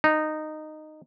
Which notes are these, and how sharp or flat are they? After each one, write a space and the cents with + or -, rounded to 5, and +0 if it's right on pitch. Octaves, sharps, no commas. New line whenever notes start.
D#4 -15